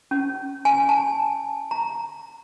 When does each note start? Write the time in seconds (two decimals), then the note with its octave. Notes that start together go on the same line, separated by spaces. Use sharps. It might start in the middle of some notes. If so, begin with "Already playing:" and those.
0.11 C#4
0.65 G#5
0.89 A5
1.71 A#5